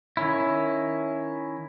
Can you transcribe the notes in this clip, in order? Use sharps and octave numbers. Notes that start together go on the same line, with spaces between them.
D#3 C#4 E4